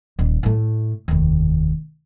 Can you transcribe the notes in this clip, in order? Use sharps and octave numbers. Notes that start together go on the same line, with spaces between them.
D#1
A2 A3
F1 D#2